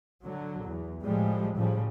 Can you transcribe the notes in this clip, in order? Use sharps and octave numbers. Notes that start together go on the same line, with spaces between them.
D3 F#3
E2
A2 F3 G3 G#3
A2 C#3 F3 G3